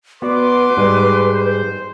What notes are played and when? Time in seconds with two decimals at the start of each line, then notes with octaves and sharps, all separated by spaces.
0.22 B3 F#4 B4 D5 C6 D6
0.77 G#2 G3 G#3
1.32 C5